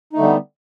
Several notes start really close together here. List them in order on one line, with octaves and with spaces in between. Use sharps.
D#4 A3 D3 G3 B3